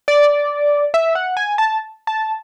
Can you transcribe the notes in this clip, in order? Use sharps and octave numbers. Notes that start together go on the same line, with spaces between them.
D5
E5
F#5
G#5
A5
A5